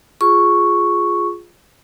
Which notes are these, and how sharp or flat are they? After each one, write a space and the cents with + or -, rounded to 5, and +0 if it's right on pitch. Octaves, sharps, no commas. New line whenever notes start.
F4 +0 G#4 +0 C#6 +0